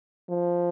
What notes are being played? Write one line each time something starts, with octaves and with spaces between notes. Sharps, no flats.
F3